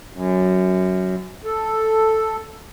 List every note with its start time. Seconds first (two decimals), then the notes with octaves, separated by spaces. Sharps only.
0.13 F#2
1.45 A4